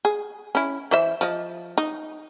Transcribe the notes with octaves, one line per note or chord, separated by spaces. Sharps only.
G#4
C#4 E4
E3 C5 E5
F3 D#5
D#4